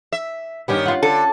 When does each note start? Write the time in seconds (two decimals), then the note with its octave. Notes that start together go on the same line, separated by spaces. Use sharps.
0.12 E5
0.68 G2 D#3 B3 C#4 G4
0.86 F4 F#5
1.03 D3 A4 A5 A6